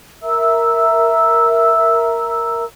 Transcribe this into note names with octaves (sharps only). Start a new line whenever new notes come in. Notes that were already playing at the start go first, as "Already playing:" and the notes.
A#4 E5 A#5 E6